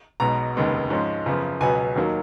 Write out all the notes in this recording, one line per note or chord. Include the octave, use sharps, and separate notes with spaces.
B1 B2 G#3 A#5
F1 D#2 C#3 G#3 B3
G#2 F3 G#3 C#4
F#2 C#3 F3 B3
C#2 B2 F#3 B3 G#5
D#2 D#3 F#3 A#3